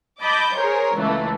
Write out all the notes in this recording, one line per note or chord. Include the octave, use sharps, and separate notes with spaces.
D#5 A5 B5 D6 G6
G#4 A#4 C5 C#5
C#2 E3 A3 A#3